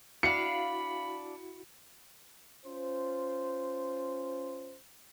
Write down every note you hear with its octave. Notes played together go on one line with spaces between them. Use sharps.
D4 E4 F#4 F5 B5 C#7
C#4 F4 C5